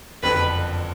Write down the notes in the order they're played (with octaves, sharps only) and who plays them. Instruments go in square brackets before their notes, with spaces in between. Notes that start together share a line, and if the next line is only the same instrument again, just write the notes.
[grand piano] F#1 F2 D3 [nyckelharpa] B4